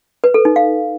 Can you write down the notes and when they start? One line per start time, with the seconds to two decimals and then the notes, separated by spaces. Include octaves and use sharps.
0.24 B4
0.34 A4
0.45 D#4
0.56 F5